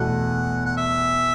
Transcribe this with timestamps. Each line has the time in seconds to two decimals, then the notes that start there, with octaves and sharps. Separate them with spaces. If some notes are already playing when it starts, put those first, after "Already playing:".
Already playing: E2 B2 A3 F#5
0.66 F#5
0.77 E5